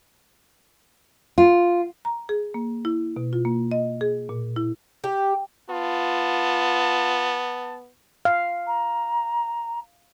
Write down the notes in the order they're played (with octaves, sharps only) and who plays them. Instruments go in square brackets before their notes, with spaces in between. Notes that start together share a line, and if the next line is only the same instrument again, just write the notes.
[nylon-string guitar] F4
[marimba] A#5
G#4
A#3
E4
B2
F4
A#3
D#5
G#4
A#2
E4
[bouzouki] G4
[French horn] B3 [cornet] F4 [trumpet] A5
[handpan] F5
[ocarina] A#5